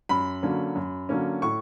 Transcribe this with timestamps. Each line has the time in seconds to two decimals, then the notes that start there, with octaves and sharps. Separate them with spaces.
0.09 F#2 B5
0.43 D3 F#3 A#3 C#4
0.76 F#2
1.09 D3 F#3 A#3 C#4
1.42 A2 C#6